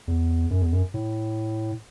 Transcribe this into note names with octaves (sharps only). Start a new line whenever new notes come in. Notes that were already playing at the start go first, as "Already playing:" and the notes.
E2
F#2
E2
F#2
A2